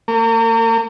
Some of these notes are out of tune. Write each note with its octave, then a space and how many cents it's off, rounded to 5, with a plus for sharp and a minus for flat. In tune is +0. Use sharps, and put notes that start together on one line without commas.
A#3 -40